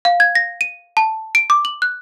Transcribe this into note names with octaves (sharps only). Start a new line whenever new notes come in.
F5
G#6
A#6
D#7
A5
D7
D6
F#7
F#6